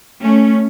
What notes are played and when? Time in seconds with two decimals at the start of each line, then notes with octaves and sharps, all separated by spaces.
0.22 A3 C#4